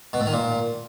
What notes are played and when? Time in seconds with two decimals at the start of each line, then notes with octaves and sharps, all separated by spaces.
0.13 B2
0.20 A2
0.26 D#3
0.33 A#2